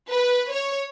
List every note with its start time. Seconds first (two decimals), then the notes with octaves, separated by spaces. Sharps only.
0.10 B4
0.53 C#5